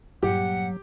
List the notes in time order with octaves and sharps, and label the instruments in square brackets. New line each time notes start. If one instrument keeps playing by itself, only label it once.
[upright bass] G2 A#2 [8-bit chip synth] F#3 [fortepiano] G4 [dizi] F#5